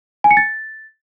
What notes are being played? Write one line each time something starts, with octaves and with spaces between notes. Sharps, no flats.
G#5
C#7
A6